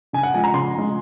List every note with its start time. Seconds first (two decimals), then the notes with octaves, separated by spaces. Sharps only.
0.13 C#3 G#5
0.23 F#5
0.34 F3 G#3 G#5
0.44 A#5
0.54 C#3 C6
0.74 F3 G#3